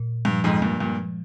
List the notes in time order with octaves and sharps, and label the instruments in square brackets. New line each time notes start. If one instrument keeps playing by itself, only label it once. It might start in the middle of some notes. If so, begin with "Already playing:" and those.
Already playing: [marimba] A#2
[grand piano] G2 [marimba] F3
[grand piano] F2 G#2
[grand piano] G2 A#2 [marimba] G#3
[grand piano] G2 A#2
[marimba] F3